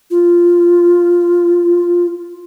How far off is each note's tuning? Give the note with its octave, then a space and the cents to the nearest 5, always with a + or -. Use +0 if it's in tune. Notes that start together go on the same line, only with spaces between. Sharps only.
F4 -5